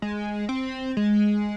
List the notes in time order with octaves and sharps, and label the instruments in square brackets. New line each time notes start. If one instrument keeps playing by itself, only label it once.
[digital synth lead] G#3
C4
G#3